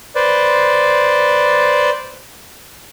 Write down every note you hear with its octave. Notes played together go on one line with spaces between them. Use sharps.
B4 C5 D5